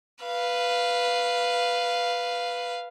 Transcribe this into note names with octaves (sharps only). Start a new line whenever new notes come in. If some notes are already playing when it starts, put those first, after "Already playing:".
B4 F5